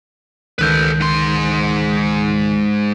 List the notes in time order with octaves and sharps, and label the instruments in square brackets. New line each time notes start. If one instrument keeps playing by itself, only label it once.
[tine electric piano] C#2 D#3 G6 [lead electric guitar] A4 B4
[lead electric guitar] G#2 C6